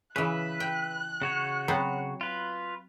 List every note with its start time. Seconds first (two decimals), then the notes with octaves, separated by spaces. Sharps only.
0.16 C#3 E3 B4 E5 F#6
0.60 G5
1.22 C#3 F#4 C#5
1.68 F#3 B3 C4
2.21 F4 B4